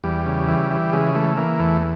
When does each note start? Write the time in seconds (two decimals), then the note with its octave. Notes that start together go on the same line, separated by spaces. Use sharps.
0.04 E2 G3
0.26 C#3
0.48 E3
0.71 E3
0.93 C#3 G#3
1.15 E3 A3
1.37 E3 A#3
1.59 E2 A3